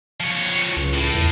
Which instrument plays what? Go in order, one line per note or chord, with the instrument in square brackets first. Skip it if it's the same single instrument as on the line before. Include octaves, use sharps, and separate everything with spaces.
[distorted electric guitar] F3 C#5
[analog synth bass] C#2
[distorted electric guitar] A2
[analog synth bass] E2